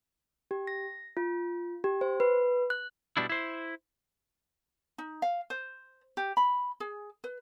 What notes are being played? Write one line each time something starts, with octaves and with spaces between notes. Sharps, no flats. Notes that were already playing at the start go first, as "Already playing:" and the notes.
G4
A#6
F4
G4
C5
B4
F#6
B2 G3 D4 E4
E4 C5
D#4
F5
C5
G4
B5
G#4
B4